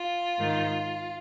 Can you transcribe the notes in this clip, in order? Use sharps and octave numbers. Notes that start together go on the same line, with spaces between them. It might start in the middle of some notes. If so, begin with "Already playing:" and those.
Already playing: F4
G#2 D#3